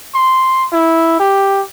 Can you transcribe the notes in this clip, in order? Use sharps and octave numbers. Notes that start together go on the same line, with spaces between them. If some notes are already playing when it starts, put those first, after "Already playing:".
C6
E4
G4